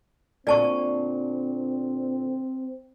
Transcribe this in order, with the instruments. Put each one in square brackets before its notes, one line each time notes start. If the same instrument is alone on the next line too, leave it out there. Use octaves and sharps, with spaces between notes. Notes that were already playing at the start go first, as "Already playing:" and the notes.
[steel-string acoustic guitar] A#2 D3 [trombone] C4 [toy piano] D5 A5 C#6